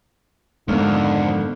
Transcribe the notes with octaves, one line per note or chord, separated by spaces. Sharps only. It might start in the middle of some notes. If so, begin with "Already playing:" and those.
G#1 F2 D3 G#3 B3 F6